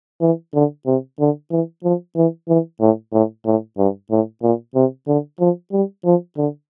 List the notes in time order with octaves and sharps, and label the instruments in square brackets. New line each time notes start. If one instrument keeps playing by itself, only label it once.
[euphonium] E3
D3
C3
D3
E3
F3
E3
E3
A2
A2
A2
G2
A2
A#2
C3
D3
F3
G3
F3
D3